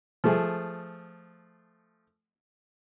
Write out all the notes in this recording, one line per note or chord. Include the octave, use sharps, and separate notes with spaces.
F3 A3 G#4